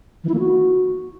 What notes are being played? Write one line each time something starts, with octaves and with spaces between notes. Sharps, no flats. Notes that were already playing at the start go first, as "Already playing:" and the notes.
E3
E4
A#3
F#4